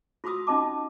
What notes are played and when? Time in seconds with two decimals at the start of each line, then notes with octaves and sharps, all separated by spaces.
0.24 F4 F#4 B5 D#6 E6
0.47 C#4 D#4 F4 D#5 A5 D6